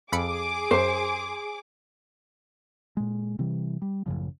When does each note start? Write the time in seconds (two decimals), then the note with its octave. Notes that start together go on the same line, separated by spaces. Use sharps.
0.12 F2 G#4 B5 D6 C#7
0.71 F#2 C5
2.97 A#2 G#3
3.39 C3 E3 G3
3.82 G3
4.06 A1 F#2 C#3 F3